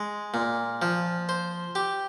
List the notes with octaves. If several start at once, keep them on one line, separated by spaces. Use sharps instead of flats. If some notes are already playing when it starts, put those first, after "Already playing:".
Already playing: G#3
A#2
F3
C5
G4